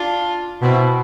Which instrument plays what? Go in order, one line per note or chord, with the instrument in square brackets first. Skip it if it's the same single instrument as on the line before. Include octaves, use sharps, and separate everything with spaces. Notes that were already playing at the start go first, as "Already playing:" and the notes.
Already playing: [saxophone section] D4 F4
[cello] B2 [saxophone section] C4 E4